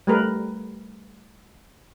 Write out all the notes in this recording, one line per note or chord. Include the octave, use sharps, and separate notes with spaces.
G3 A3 A#4 B4